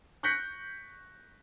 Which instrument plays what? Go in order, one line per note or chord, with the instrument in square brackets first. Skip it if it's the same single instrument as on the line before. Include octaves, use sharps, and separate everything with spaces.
[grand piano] C#6 F#6 G6 A#6 B6 C#7